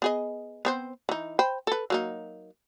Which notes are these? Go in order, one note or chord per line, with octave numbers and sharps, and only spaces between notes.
B3 G#4 D#5
B3 C4 C5
E3 D#4
C5 G5 B5
A4 B4
F#3 A#3 D#4